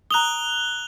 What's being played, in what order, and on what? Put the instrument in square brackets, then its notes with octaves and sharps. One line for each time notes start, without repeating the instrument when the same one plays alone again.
[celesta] A#5 D#6 [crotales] F#6 F7 G7